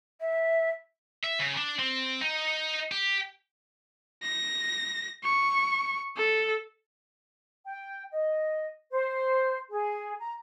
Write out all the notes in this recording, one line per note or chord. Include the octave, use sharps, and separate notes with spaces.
E5
E5
C#3
D4
C4
D#4
G4
A#6
C#6
A4
G5
D#5
C5
G#4
A#5